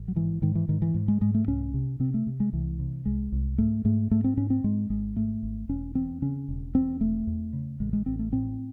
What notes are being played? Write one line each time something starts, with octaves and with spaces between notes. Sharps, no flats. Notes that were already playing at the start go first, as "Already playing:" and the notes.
Already playing: A1
F#3
G#2 E3
G#2 D#3
E3
G#2 D#3
E3
G#2
G#3
G#2 G#3
A3
C2 C#4
C3
C3 C4
A3
C3
G#3
C2 E3
C3
C2 G#3
C2
G#2 A3
G#2 A3
G#2 A3
C4
G#2 C#4
C4
G#2 G#3
G#1 G#3
G#2 A3
G#1
E1 C#4
E2 C4
C#3 C#4
E1
E2 C4
E1 A3
E2
C#3
A1 G#3
G#3
A1 C4
A3
A2 C4